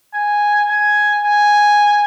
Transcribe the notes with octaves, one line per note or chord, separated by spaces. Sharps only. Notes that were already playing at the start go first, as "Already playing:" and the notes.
G#5
G#5
G#5